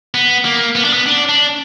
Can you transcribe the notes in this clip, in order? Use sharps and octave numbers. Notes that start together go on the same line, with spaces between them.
B3
A#3
B3
D4
B3
D4
D4